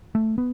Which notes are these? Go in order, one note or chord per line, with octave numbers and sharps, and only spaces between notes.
A3
B3